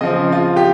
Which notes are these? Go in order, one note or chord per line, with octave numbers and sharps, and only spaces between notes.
C#3 F3 C4 D#5
F4
G4